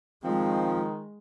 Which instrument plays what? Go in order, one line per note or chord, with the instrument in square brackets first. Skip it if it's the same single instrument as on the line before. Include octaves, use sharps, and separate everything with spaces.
[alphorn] D#3 [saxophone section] F3 C4 [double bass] G#3